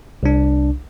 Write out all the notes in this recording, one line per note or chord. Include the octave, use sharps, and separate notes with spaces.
C2 D4